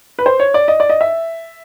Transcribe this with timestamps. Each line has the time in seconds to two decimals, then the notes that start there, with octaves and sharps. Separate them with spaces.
0.19 B4
0.26 C5
0.40 C#5
0.54 D5
0.68 D#5
0.80 D5
0.90 D#5
1.01 E5